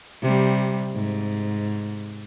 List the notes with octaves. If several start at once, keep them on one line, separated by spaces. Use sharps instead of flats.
C3 G3
G#2